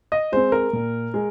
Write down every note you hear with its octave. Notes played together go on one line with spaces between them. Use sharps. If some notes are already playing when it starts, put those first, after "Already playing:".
D#5
G#3 C4 C5
A#4
A#2
G#3